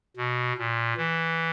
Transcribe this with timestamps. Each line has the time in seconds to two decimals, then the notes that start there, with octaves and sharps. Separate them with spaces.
0.17 B2
0.58 A#2
0.97 E3